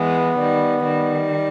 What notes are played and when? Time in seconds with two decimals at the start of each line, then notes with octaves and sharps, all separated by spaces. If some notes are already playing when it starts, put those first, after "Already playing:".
Already playing: E3 G#3 B3
0.38 D#3 G3
0.84 D#3 G3